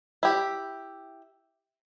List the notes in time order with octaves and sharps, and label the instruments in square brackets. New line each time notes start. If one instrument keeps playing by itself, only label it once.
[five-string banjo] E4 G4